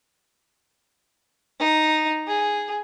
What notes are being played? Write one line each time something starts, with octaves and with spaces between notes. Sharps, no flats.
D#4
G#4